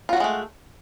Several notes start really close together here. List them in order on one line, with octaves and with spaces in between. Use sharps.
F4 F#4 F#3 G#3 A3